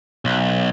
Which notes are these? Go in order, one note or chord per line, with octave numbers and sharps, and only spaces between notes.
B1